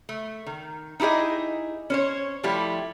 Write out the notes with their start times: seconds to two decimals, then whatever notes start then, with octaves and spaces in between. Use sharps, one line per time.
0.09 A3
0.46 D#3
1.00 D#4 E4 G4 G#4 D#5
1.90 C#4 C5 C#5
2.43 F3 G3 A3 E4 G4